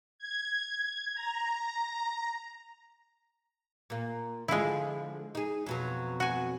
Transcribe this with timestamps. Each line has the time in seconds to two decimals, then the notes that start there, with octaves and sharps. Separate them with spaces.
0.18 G#6
1.15 A#5
3.90 A#2 A#3
4.48 D3 F3 G#3 E4 F4
5.35 D#4 G#4
5.66 F2 B2 F#3
6.20 F#4 G#5